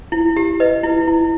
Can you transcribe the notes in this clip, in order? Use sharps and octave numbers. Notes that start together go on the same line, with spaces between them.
E4
G4
B4 D#5
E4
E4